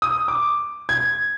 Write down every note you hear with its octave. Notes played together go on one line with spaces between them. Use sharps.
D#6
D6
G#6